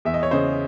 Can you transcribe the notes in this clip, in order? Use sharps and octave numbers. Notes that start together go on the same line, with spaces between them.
E2 E5
D#5
C#5
C#3 C5 D#5